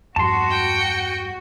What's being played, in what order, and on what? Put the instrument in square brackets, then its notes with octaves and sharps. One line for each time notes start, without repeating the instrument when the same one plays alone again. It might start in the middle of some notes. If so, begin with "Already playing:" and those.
[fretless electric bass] E2 G2 F3 [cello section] F#4 [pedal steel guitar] A5 C6
[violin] G5 C#7